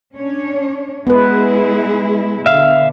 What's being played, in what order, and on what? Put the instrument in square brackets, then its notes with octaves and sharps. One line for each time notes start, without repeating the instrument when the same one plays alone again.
[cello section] C#4 D4 C#5
[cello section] G#3 E4 G#4 [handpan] B3 B4
[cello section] B2 D3 [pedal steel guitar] E5 F5